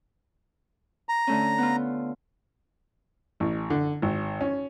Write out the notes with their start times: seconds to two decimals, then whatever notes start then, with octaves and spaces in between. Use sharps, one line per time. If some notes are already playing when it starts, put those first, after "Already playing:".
1.09 A#5
1.27 D3 A3 C#4
1.58 B3 F4
3.40 A1
3.70 D3
4.02 G#1
4.41 C#4